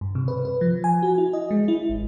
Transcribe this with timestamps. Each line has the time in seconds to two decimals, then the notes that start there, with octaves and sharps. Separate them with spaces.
0.01 G2
0.15 C3
0.28 B4
0.45 B4
0.61 F3
0.84 G#5
1.03 F#4
1.18 E4
1.33 D#5
1.51 G#3
1.68 E4
1.89 G#1